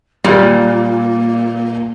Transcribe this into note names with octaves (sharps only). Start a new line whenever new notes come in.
A#2 G3 A#3